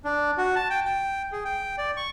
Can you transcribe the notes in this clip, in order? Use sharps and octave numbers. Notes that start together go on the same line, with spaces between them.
D4
F#4
A5
G5
G5
G#4
G5
D5
C#6